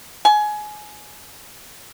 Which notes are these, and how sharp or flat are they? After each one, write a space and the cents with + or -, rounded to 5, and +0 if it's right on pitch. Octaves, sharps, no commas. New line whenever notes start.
G#5 +20